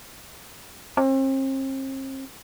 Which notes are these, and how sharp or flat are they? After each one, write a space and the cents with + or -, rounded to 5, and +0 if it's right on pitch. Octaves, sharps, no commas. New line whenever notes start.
C4 +40